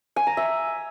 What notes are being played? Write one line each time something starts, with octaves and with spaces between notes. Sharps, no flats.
G#5
A#5
E5